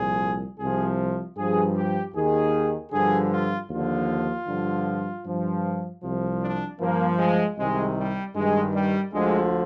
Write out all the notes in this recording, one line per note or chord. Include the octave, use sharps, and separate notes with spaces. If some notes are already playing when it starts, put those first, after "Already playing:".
Already playing: C2 A#2 F3 G#4
C2 C3 F3 G#4
G2 F3 G#4
G4
D#2 D#3 G#4
G2 D3 F3 G#4
F4
D#2 D3 F3 F4
G2 D3 F3
G2 F3
C2 C3 F3
D4
G2 F3 A#3
G#3
C2 C3 D#3 G#3
G3
G2 D#3 G#3
G3
D2 D3 F3 G#3